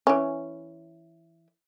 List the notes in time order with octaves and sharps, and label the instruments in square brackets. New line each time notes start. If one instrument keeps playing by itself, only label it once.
[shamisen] E3 C#4